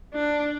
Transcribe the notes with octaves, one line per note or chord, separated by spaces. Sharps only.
D4